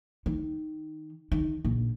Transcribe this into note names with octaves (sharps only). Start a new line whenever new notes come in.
D#3
D#3
A#1